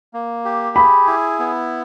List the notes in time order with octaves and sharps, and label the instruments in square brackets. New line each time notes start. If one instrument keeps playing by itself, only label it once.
[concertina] A#3
G4
[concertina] G#4 [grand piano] B5
[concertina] E4
B3